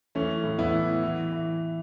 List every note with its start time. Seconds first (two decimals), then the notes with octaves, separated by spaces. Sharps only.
0.15 E3 A3 C#4
0.44 A2
0.59 B3 E4
0.73 E3
1.03 E3
1.32 E3